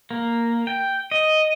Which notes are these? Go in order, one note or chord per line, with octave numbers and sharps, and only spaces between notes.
A#3
G5
D#5